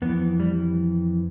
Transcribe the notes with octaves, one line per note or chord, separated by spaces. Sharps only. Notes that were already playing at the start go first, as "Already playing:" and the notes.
F2 E3 B3
G3